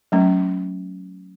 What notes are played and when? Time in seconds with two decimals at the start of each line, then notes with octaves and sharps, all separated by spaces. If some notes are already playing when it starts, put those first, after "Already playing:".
0.12 F#3 A3 C#4